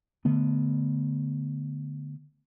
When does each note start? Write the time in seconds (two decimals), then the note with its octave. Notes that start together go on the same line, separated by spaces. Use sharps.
0.25 D3 A3 B3